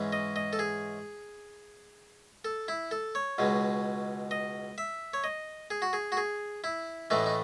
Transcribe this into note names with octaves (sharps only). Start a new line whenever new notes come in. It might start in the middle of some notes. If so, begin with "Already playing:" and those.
Already playing: G#2 E3 G#3 C#4
D#5
D#5
A4
G#4
A4
E4
A4
C#5
C#2 B2 G#3
D#5
E5
C#5
D#5
G#4
F#4
G#4
F#4
G#4
E4
A1 A2 E3 A3 D#4
D#4